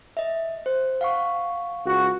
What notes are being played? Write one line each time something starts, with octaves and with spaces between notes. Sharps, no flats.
D#5 E5
C5
F5 F#5 C#6
C#2 F#4